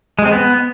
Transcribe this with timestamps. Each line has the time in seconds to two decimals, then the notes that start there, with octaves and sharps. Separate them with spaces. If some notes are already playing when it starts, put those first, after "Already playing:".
0.19 G#3
0.25 C4
0.32 B3